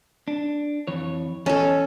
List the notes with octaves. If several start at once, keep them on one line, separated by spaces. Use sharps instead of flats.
D4
F2 E3 C#5
E2 C#4 A4 D#5 A5